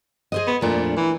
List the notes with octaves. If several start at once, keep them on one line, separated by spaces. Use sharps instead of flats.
G#4 C5 D#5
B3
F2 A#2 A3 D4
E3